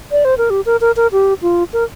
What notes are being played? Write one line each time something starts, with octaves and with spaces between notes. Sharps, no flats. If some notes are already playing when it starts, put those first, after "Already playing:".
D5
C5
A#4
G4
A#4
A#4
A#4
G4
F4
A#4